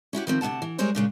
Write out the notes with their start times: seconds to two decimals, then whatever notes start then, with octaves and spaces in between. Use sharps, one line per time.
0.13 C#4 E4 F#4 G4
0.27 D#3 F3 C4
0.41 D2 C3 E3 F#5 A5
0.62 E3
0.78 G3 G#3 G#4 A#4 C5 C#5
0.95 A#2 C#3 G#3